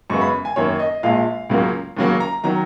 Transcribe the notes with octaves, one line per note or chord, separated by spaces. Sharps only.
F#2 C#3 G#3 B3 C#6
B5
G#5
F#2 D#3 A#3 C#5
D#5
A#1 A#2 G#3 F5
C#2 C#3 F#3 A#3
D#2 C#3 F#3 A#3
A#5
D#3 F#3 A#5